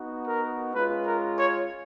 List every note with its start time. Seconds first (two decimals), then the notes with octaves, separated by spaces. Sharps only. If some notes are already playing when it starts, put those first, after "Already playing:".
Already playing: B3 D#4 F#4
0.28 A#4
0.75 G#3 C#4 F4 B4
1.06 A#4
1.38 C#5